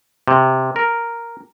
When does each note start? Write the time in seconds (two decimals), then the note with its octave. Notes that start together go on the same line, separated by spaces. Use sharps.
0.28 C3
0.76 A#4